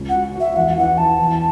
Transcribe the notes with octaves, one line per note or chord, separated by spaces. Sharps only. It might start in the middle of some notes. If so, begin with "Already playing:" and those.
Already playing: C#2
F#5
F#4
F#4 E5
E2 F#5
E3 F#5
E3 A5
E2